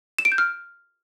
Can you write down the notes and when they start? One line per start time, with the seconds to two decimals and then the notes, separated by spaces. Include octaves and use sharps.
0.18 E7
0.25 D7
0.32 G6
0.38 F6